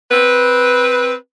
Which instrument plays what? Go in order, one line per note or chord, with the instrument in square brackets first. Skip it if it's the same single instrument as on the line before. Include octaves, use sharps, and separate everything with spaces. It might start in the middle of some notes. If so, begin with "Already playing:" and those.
[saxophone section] C4 B4